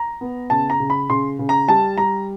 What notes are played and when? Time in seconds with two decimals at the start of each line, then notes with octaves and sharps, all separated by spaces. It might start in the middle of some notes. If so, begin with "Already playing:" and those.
Already playing: A#5
0.21 B3
0.50 C#3 A5
0.70 A#5
0.80 C#3
0.90 B5
1.10 C#3 C6
1.39 C#3
1.49 A#5
1.68 G3 A5
1.98 G3 A#5